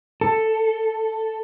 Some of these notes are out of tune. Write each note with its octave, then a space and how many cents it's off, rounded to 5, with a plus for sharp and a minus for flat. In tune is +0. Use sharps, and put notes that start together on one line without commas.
A4 +5